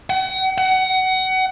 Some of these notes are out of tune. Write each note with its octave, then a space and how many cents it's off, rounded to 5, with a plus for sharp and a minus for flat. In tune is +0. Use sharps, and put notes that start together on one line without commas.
F#5 +40
F#5 +25